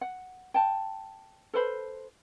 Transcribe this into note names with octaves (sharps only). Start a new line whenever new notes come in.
F#5
G5 A5
A4 B4 C5 B5